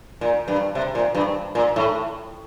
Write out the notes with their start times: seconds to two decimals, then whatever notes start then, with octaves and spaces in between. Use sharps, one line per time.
0.21 A#2
0.48 G2
0.75 C3
0.95 A#2
1.15 G2
1.55 A#2
1.76 A2